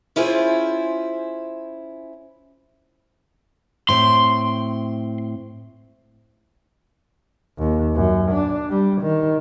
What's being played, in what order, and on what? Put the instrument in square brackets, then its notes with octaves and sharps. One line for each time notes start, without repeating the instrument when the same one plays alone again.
[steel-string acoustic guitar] C#4 E4 F4 G#4 A#4 C5
[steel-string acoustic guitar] A2 C4 [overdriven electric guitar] C6
[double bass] D#2
F#2
D4
G3
D#3